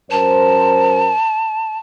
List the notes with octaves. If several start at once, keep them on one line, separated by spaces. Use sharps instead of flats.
F#2 A#4 C5 A5